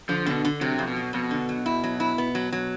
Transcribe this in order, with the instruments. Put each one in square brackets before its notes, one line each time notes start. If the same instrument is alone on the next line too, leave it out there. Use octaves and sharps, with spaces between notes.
[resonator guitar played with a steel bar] D3 [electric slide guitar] F3
[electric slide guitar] B2 [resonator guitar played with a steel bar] D3
[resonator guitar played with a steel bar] D3
[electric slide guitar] C3 [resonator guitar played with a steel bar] F#3
[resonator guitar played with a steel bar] F2
[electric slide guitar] B2
[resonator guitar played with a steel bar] F#3
[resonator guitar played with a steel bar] F2 [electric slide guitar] B2
[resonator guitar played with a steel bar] D3
F#3
E4
F#3
E4
B3
F#3
F#3